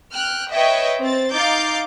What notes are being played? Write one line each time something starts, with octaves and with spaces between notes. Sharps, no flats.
G5 F6 F#6
B4 C#5 D#5 E5 G5
C4 A6
D#4 F5 D6 G6 A6